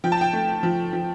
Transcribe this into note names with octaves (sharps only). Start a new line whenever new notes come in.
F3 G5
A5
G5
A3
F3
F3